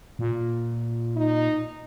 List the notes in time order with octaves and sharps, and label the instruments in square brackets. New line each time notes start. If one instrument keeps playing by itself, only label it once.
[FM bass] A#2
[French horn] D#4